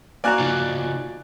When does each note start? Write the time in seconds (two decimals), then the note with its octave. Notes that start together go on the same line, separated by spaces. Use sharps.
0.24 A#3 F#4 D5 G#5 A#5 F#6
0.40 C#3 D#4 F4